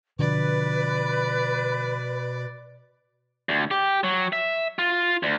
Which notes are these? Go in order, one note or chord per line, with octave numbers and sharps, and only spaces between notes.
B2 D3 F3 B4 D5
D2
G4
F#3
E5
F4
D2